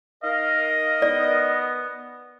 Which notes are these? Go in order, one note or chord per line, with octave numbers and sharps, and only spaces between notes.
D#4 A#4 D#5 F5
B3 D5